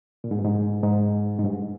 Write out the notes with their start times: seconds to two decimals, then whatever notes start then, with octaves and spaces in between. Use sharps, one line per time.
0.24 A#2
0.31 G#2
0.39 G2
0.45 G#2
0.83 G#2
1.39 G#2
1.44 G2